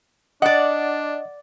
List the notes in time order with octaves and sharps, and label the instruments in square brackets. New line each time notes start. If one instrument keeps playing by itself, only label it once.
[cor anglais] D4 [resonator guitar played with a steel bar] D5 F#5 [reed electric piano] D#5